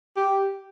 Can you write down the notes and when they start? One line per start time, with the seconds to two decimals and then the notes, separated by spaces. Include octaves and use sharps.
0.17 G4